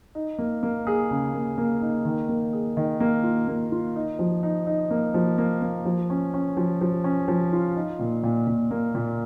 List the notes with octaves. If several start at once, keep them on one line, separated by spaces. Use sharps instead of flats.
D#4
A#3
A#3
G#4
C#3
A#3
A#3
D#4
D#3
A#3
G#4
D#3
A#3
F4
A#3
F4
D#4
F3
D#4
D#4
A#3
F3
A#3
A#3
F3
C#4
C#4
F3
F3
C#4
F3
F4
D#4
A#2
A#2
A#2
A#3
A#2